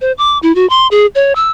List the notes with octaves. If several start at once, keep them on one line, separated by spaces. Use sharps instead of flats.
C5
D6
E4
F#4
C6
G#4
C#5
E6